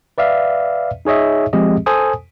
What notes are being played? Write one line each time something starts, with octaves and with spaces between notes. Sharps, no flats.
B4 D5 E5 F5
D#4 G#4 C#5 D#5 E5
F3 G#3 C4 G4 G#4 D#5
A4 C5 G#5 D#6